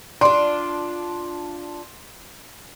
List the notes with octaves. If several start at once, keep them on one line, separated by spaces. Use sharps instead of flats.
D4 F4 C6